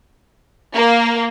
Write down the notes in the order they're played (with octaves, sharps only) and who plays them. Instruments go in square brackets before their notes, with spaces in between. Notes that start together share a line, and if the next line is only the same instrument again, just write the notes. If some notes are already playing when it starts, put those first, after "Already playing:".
[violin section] A#3